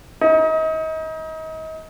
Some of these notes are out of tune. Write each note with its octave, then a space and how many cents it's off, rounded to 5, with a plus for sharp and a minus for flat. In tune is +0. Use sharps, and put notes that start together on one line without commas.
D#4 +35